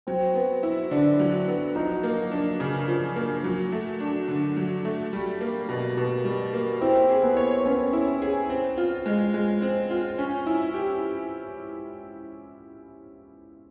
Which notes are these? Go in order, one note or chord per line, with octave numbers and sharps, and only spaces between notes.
F#3 C4
B3
E4
D3 D4
F#3
B3
F3 D#4
A#3
D4
C#3
F3
A#3
F#3
A3
D4
D3
F#3
A3
G3
A#3
B2
B2
G3
A#3
C4 E4
G#4
B3
C#5
B3 C#4
E4
G#4
C4
F4
G#3
G#3
C4
F4
C#4
E4
G4